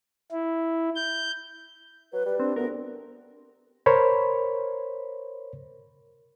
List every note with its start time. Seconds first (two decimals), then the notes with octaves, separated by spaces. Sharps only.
0.32 E4
0.95 G6
2.13 F#3 B4
2.26 G3 B4
2.40 C4 D4
2.56 D2 B3 A#4
3.86 A#4 C5 C#5 B5